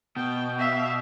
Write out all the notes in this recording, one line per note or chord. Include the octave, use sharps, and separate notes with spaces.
B2 G5
E5 F5